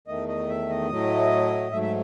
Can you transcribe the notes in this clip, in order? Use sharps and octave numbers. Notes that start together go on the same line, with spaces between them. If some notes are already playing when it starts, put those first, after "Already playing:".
E2 D#3 A3 D#5
D#5
E5
D#5
A2 F#3 A3
G#2 F#3 A3 E5
E5